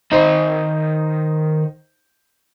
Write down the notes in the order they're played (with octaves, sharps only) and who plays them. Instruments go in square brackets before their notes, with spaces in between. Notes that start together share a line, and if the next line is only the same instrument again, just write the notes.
[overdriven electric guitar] D#3 B5 [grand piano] D#4 C5